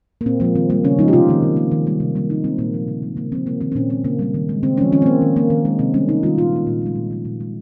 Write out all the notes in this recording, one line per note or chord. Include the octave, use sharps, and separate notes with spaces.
A#3
A#2 C4
F3 G#3 A#3
D#3 C4
G3 A#3
C#3 C#4
F3 G#3 D#4
G4
C3 F4
D#3 A#3
D#3
A#3
D#3
G3 A#3
C3
G3 A#3
D#3 D#4
G#3 C4
A#2 A#3
F3 G#3
C#3
G#3
C#3 A#3
F3 A#3 C4
C3 A#3
D#3 A#3 C4
C4
A#2 C#4
G#3 C4
C#3 A#3
G3 A#3
D#3
G#3
C#3 C4
F3 G#3 C#4
D#3 C#4
C4
A#3
D#3
A#3
D#3
G#3
C3 C4
G3 A#3 C#4
C3 D#4
D#3 G3 F4
A#2 F4
G3 A#3
A#2
F3 G#3
A#2
F3 G#3
A#2
G#3